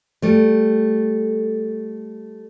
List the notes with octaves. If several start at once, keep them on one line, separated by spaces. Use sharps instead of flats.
G3 A3